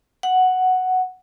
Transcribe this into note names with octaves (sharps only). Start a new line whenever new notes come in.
F#5